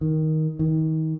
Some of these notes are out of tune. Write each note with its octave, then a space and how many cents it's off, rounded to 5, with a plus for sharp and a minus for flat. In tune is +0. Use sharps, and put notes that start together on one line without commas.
D#3 +10
D#3 +30